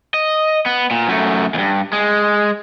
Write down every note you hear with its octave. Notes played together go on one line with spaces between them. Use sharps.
D#5
B3
A#2
F#2 A3
E2 G2
G#3